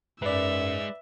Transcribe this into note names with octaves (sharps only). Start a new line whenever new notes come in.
F#2 G#3 D#4 B4 D5 E5